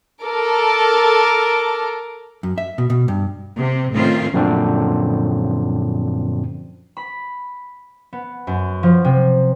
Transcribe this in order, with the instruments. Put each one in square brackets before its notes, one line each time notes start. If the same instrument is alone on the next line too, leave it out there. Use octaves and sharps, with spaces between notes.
[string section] A4 A#4 D6
[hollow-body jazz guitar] F#2
E5
B2
B2
G2
[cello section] C3
A2 D#3 A3 C4 C#4 F4
[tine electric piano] F#2 A#2 D3 F3 C4 D4
[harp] B5
B3
F#2
F3
C3